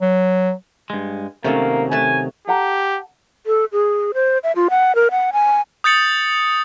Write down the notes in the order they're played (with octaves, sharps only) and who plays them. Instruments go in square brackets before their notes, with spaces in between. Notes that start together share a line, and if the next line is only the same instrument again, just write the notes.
[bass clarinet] F#3
[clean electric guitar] G2 G#3
[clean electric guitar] C3 D#3 F#3 [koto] A3 C#4 A4 [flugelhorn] A#3
[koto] A3 B4 A5 [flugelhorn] G#5
[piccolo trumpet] G4 [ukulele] A4 F#5 A#5
[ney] A4
G#4
C5
E5
F4
F#5
A#4
F#5
G#5
[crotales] D#6 G6 A6 C#7 F#7